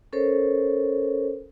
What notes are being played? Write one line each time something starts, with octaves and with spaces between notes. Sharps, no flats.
C#4 A4 A#4 C5 C#5